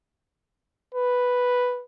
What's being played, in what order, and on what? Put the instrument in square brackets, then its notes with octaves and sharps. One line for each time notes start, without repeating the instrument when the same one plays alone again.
[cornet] B4